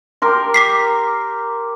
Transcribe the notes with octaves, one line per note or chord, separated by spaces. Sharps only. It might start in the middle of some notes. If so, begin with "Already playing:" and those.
G4 A#4 C6
D6 B6 C7